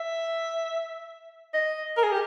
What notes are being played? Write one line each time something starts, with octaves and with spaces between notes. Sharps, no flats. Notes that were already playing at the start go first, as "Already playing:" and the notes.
Already playing: E5
D#5
A#4
G#4
G4